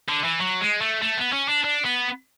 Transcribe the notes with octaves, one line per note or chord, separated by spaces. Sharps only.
D3
E3
F#3
G#3
A3
A3
B3
C#4
D4
D4
B3